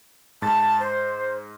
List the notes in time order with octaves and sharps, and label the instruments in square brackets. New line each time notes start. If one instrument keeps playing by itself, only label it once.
[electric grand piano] G#2 A6 [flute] A5
[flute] C5